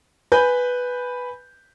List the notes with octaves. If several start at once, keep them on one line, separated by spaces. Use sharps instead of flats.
B4 G#5 B5 G6